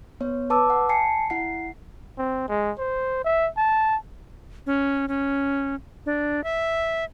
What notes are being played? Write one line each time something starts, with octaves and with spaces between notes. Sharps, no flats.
B3 C#5
B4 A5 D6 E6
F#5
G#5 A5 C7 C#7
E4 F#5 C7
C4
G#3
C5
E5
A5
C#4
C#4
D4
E5